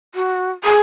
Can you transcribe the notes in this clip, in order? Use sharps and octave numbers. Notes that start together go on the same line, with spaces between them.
F#4
G#4